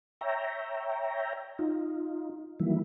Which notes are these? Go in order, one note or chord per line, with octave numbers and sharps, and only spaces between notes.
C#5 E5 G5 A#5
D#4 F4
D#3 E3 F#3 G3 A#3 E4